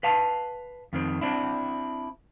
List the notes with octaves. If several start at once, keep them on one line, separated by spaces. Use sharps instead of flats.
B4 F5 A5
F2 D#3 C4
C4 D4 E4